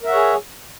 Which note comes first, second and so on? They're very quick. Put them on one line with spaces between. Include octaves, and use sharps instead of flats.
A#4 E5 F#5 C#5 G#4